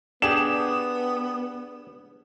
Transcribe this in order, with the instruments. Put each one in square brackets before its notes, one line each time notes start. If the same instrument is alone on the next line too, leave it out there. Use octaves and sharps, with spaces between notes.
[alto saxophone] B3 [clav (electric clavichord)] D4 G4 G#4 [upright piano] E7